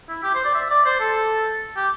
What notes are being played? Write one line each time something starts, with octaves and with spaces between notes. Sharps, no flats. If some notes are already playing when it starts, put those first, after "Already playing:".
E4
G4
C5
D5
E5
D5
C5
A4
G4